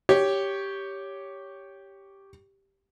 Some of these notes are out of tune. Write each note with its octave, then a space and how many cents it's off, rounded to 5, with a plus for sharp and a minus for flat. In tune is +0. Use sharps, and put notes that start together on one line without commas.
G4 +0 C#5 +10